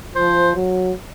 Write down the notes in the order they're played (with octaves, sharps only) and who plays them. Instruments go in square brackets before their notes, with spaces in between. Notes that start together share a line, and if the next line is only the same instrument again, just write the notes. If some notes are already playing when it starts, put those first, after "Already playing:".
[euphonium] F3 [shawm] C5
[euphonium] F#3